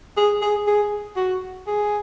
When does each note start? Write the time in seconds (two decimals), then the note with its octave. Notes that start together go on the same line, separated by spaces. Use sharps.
0.17 G#4
0.42 G#4
0.67 G#4
1.17 F#4
1.67 G#4